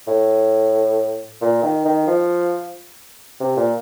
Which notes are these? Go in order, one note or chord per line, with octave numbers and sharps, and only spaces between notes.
A2
A#2
D#3
D#3
F3
C3
A#2